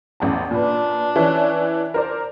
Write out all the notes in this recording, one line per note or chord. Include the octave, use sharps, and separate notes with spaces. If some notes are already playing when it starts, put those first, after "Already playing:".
A1 E2 A5
A#2 D4 B4
E3 C#4
A#4 C5 D5